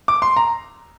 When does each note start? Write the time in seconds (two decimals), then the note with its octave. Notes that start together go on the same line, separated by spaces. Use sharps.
0.08 D6
0.22 C6
0.37 A#5